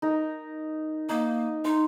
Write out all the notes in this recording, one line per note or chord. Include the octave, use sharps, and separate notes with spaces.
D#4 A#4
A#3 D#4
D#4 C6